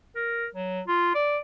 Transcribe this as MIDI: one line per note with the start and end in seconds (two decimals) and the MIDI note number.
0.16 0.47 70
0.55 0.81 54
0.87 1.14 65
1.15 1.38 74